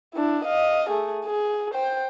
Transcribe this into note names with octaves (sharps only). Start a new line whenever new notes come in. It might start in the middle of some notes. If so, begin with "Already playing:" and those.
D4 E4
D#5 F5
A3 G#4
G#4
C5 G5